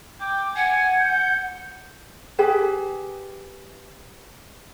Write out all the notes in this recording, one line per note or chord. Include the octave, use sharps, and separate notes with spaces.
G5 D6
F#5 G#5
G6
G4 G#4 B4